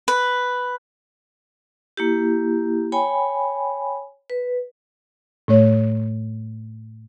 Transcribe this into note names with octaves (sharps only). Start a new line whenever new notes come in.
B4
A#3 E4 G4
C#5 G5 G#5 B5
B4
A2 A3 C#5